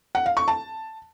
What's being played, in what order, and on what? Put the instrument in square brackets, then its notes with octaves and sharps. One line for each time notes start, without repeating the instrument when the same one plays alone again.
[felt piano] F#5
F5
C#6
A5